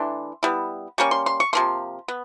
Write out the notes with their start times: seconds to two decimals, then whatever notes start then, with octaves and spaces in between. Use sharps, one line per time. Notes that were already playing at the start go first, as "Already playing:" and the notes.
Already playing: E3 A3 D4 C6
0.43 G3 B3 E4
0.98 G3 A#3 C#4 C#6
1.11 C6
1.26 C6
1.40 C#6
1.53 C3 F3 A#3 C6
2.08 B3